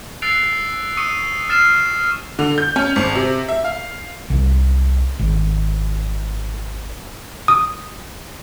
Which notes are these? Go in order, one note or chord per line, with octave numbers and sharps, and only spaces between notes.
E6 F#6 A6 C7 D7 F7
C#6 D#6 E6 C#7 D#7
F6 A6 C7 E7
D3
G6
C#4
G#1
C3
E5
F5
C2
G#1
D#6